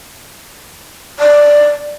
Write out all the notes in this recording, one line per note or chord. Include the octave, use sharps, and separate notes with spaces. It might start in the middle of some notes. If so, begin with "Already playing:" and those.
D5